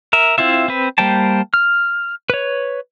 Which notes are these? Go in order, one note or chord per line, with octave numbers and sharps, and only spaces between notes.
A#4 E5
C4 E4 F4 E5
C4 B4
G3 A#3 C5 G5 A5
F6
B4 C#5